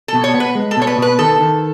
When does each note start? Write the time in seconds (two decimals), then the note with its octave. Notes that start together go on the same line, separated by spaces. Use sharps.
0.08 A4
0.14 B2
0.24 C#5
0.34 B3
0.40 B4
0.55 G#3
0.71 A4
0.77 B2 C#5
0.87 B4
0.98 B2 B4
1.19 D#3 A4
1.40 D#3